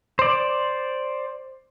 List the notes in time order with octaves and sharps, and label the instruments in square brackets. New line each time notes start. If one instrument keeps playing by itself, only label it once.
[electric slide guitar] C5 D5